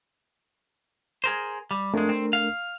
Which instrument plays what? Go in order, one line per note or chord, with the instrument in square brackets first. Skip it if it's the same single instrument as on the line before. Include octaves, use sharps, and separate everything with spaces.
[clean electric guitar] G#4 A#4 C5
G3
[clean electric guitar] F2 G#3 [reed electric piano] A3 D4 A#4
[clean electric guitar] C4
F5